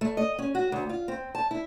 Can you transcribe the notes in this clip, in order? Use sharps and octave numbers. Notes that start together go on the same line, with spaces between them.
A3
D#5
C#4
F#4
D2
F4
C4
A5
E4